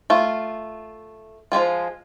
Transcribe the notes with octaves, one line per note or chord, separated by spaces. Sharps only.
A3 F4
F3 F#3 G#3 F4